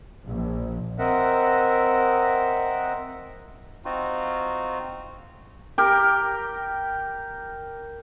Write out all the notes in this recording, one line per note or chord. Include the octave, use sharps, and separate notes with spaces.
A#1
C4 A#4 D#5 E5 F#5
C4 D#4 F4 F#4
G4 A#4